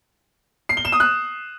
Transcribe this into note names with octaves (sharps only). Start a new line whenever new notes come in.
C7
G7
E7
D#6
F#6